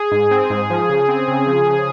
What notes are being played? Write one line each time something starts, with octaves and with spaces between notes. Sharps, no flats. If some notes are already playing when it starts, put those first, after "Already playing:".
Already playing: G#4
G#2
C4
G#2
F3
C#3
C4
C#3
F3
C#3